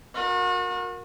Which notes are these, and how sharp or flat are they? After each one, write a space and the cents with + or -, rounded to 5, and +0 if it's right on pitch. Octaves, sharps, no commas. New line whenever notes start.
F#4 -40 A#4 +0